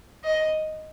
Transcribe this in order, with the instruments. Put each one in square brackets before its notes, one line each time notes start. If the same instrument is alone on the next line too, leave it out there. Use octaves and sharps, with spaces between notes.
[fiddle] D#5